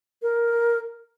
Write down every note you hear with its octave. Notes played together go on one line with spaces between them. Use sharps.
A#4